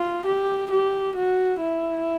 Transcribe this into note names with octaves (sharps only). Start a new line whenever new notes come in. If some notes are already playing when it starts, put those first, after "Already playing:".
Already playing: F4
G4
G4
F#4
E4